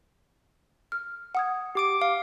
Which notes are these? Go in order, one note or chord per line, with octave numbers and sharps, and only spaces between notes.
F6
F#5 D#6 G#6
G4 D6 D7
F5